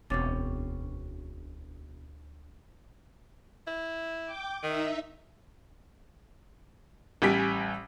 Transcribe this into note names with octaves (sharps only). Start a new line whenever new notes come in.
E1 D2 B2 C4 C#4 D6 A6
E4
G5 D6
D#3 D#4 E5
A1 G3 G4 G#5 B6 D7